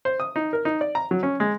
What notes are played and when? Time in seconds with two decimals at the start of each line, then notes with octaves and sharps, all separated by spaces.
0.05 C5
0.20 D#6
0.36 D#4
0.53 A#4
0.65 D#4
0.81 D5
0.95 A#5
1.11 F#3
1.23 C#4
1.40 G#3